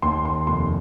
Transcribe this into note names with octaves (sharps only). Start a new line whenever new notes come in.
D#2 C6
C6
F1 C6